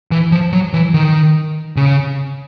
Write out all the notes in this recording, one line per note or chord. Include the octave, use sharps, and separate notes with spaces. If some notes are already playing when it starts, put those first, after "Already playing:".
E3
F3
F#3
E3
D#3
C#3